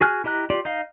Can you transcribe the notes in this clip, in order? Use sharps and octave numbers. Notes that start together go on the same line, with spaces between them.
F#4 G#4 G#5 F6 F#6
E4 G4 D#5 A#5 F#6
F4 G4 D5
D#4 D#5 F5